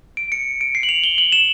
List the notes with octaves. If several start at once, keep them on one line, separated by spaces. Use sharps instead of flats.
D7
C#7
D7
C7
F#7
F7
G7
F#7
E7